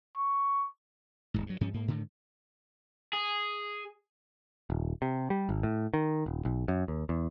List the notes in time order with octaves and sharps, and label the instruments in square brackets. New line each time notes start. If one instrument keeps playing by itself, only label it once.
[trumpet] C#6
[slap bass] D1 A1 G#2
G2 F#3
G2 F3 C#4
G#2 A#3
G#2 D3 D#3
[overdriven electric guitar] G#4
[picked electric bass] D#1
C3
G3
G#1
A2
D#3
D#1
B1
F#2
D#2
E2